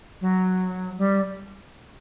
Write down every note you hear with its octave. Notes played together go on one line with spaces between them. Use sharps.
F#3
G3